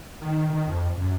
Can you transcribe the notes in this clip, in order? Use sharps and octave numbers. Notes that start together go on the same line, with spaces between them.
D#3
D#3
F2
F#2